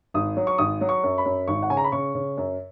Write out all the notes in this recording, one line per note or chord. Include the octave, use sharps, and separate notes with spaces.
G#1 D#6
F#3
C#6
G#1 D#6
F#3
C#6
F#2
B5
F#2
G#1 C#6
F#5
C#3 G#5
A#5
B5
C#3 C#6
C#3
F#2